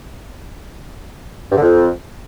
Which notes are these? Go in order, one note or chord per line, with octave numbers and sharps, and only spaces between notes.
G2
D3
F2